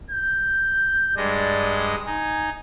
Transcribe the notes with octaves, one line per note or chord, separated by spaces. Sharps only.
G6
G2 G#3 D5 D#5
D#4 G#5